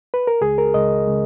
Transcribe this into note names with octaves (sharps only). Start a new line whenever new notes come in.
B4
A#4
C#2 C#3 G#3 G#4
A#4
C#2 C#3 G#3 D#5
C#3 G#3